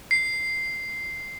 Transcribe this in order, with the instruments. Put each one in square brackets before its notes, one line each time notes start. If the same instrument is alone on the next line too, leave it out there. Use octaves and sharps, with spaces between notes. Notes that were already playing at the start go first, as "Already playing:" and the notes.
[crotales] C7